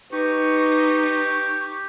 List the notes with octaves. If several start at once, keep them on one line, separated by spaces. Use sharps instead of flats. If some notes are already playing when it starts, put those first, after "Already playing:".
D#4 G4 B4 C#6